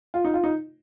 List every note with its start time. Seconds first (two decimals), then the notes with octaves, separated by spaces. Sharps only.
0.14 F4
0.24 D#4
0.34 F4
0.44 D#4